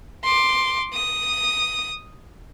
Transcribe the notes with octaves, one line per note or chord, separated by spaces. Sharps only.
C6 D6
D#6